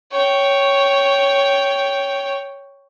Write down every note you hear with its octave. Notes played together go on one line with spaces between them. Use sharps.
C#5 G5